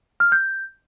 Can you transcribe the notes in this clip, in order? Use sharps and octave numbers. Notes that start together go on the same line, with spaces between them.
F6
G6